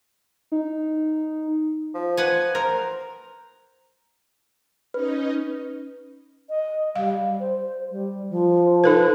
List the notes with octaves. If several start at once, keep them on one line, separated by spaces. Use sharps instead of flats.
D#4
F3
B4 F#5 G#5
A#4 C5
C#4 D#4 B4 D#5
D#5
G3 F5
C5
G3
F3
D#4 A4 B4